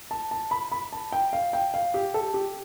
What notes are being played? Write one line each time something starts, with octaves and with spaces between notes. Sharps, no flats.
A5
A5
B5
B5
A5
G5
F5
G5
F5
G4
A4
G4